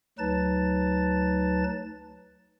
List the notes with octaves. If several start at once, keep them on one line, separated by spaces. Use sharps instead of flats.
D2 F#3 D#4 B4 A5 A6